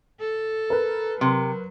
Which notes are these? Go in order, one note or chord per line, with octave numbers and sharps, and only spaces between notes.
A4
A#4 B4
C3 F#3